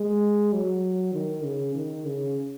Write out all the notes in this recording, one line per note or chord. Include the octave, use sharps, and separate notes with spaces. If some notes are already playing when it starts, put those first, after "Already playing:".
Already playing: G#3
F#3
D#3
C#3
D#3
C#3